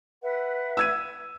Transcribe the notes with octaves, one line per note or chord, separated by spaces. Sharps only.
B4 E5 F#5
E6 G#6 D#7